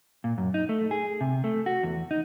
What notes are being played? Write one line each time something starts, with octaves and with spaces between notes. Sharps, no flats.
A#2
F#2
D#4
A3
G#4
C3
A3
F#4
E2
D#4